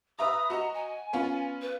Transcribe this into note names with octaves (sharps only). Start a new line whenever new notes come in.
B4 E5 A#5 D#6
F#4 D#5 A#5
G#5
B3 C#4 F4
B4